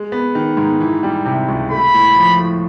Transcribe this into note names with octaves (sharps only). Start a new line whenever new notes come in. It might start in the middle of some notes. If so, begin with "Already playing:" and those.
Already playing: G#3
B3
D#3
G#2
E3
G3
C3
C#2
A3 B5
A2
F3
A2